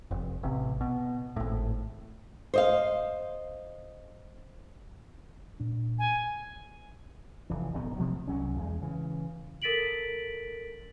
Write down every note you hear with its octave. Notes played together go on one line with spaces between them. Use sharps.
F1
A1 C3
B2
G#1 A2
C5 D#5 F5
A#2 D4
G#5
F1 E3
D1 B1 D#3 B3
B2 F3 F#3 A3
C2 F#3 C#4
E2 G#3
C#3 E3
A4 A#4 A6 B6 D7 F#7